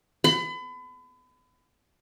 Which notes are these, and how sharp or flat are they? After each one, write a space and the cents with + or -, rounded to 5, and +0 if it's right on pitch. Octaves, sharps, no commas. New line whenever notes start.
B5 +35